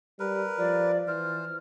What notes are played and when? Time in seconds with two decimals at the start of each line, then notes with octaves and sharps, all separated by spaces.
0.20 G3 A#4 B4
0.58 F3 D5
1.07 E3 C5 F6